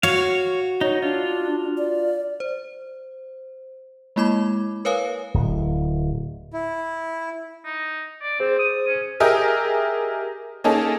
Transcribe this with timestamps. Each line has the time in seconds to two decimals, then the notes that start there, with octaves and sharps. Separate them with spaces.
0.03 F#4 C#5 F5
0.81 D#4 C#5
1.02 D4 F4
1.78 D5
2.40 C5
4.16 G#3 A#3 E4 B5 D6 G#6
4.85 A#4 B4 C#5 F5 G#5 D#6
5.34 D1
6.53 E4
7.66 D#4
8.22 D5
8.40 C4 G#4 C5
8.59 D#6
8.88 C#4
9.20 G4 G#4 A#4 D#5 E5
10.64 A#3 C#4 D#4 G#4 A4